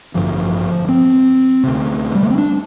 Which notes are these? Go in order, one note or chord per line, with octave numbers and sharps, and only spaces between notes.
A1 G2 D3 F3
C4
D2 C3
G3
A3
C4
D4